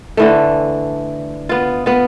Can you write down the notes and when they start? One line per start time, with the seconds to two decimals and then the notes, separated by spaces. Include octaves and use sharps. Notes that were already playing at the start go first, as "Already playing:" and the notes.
0.17 D3 E3 A3
1.49 B3 F4
1.86 B3 F4